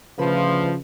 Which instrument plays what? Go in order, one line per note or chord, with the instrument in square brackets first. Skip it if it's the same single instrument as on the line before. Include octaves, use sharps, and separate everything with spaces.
[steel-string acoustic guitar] D2 B4 [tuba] C#3 [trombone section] F3